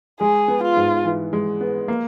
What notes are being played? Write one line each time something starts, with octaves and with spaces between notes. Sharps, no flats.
G#3 G#4
B3
F4
G#2
E3
G#3
B3
A#3